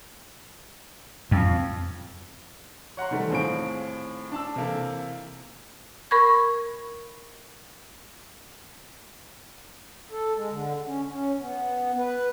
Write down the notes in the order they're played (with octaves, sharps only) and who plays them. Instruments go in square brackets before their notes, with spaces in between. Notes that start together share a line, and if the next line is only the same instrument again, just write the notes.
[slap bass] F2
[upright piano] C#5 F#5 A#5 C6
C3 D#3 E3 G3 A3
D#2 A2 C4 F4 G#4 D7
D4 A5 E6
C3 E3 A#3 A4
[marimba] A#4 B5 C#6 G#6
[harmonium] A4
G#3
D3
C#4
C#4
B3
B4